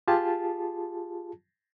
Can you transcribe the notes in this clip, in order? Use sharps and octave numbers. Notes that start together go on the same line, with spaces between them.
F4 G4 G#4 A5